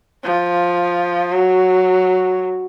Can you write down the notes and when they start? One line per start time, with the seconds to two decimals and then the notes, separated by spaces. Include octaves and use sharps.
0.24 F3
1.31 F#3 F#4